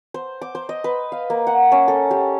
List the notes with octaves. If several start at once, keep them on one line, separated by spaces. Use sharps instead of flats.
C5
D6
C5
D#5
B4
F5
A#3
F#5
C#4
A4
G4